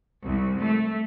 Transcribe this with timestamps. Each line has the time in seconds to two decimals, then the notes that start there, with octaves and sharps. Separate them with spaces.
0.23 C2
0.59 A3